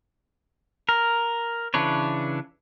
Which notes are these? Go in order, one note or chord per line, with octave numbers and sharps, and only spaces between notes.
A#4
C#3 E3 D4 B4 C#5